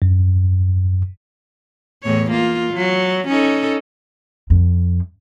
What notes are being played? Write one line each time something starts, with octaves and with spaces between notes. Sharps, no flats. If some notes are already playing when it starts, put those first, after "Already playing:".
F#2
E2 A2 C#5
A#3 F4
F#3
C#4 D#4 A4
F2